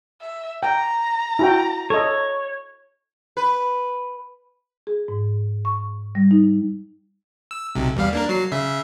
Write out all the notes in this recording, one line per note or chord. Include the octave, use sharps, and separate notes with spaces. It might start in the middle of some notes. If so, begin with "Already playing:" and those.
E5
G5 A#5
E4 F#4 G5
A4 C#5 D#5
B4
G#4
G#2
C#6
G3
D#4
E6
B1 C3
E2 G3 F5
A#3 D4 A#4
F#3 C7
C#3 E5